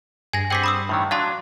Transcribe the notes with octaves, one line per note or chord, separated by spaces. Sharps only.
G2 G#4 G#5 A#6
C4 G#4 F#5 G5 D6 B6
B5 D#6 E6
A2 D#3 E3
F#3 D4 F5 A5 C6